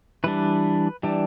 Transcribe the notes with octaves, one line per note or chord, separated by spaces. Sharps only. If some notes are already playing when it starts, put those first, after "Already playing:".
E3 G3 D4 B4
E3 G3 D4